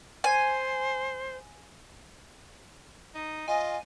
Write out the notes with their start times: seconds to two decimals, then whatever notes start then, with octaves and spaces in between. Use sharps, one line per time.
0.24 C5 G#5
3.15 D#4
3.48 F4 D#5 G#5